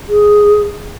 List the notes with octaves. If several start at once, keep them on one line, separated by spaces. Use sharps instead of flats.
G#4